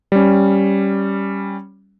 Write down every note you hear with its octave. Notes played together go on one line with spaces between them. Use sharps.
G3 C#4